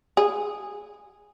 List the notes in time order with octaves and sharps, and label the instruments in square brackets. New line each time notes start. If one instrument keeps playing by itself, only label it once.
[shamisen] G#4